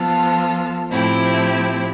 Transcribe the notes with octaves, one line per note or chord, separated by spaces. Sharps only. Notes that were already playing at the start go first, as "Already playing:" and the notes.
Already playing: F3 B3 F4 A4
A2 F3 C4 E4 G4